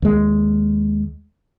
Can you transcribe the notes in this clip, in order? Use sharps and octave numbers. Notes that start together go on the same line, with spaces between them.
D#2 G#3